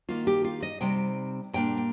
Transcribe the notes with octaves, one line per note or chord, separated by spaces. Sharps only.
D#3 A#3 D#4 F4
G4
F4
D#5
C3 G3 C4 D#4 G5
A#2 G3 A#3 D4 G5
G5